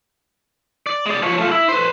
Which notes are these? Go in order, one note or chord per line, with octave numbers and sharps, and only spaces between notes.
D5
G#3 D5
F3 C#5
A3 F4
E4
B4 C5